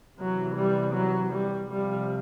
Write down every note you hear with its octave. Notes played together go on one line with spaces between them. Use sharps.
C3 E3 F#3
G3
F#3
G3
C3 F3 G3